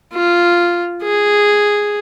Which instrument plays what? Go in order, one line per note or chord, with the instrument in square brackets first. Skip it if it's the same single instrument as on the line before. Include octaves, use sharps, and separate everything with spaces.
[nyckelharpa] F4
G#4